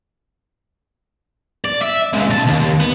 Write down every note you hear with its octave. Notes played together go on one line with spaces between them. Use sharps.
D5
E5
C#3 G#3
B1 A5
D#2
B3